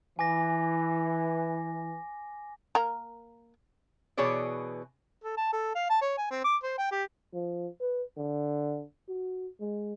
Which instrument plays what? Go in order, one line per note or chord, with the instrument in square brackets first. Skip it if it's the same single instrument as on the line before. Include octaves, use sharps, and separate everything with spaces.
[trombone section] E3 [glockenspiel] G#5 D6 A#6
[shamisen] A#3 A#4
[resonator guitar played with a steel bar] B2 E3 G#4 C#5 D5
[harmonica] A4
A5
A4
F5
A5
C#5
G#5
C4
D6
C5
G5
G4
[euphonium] F3
B4
D3
F#4
G#3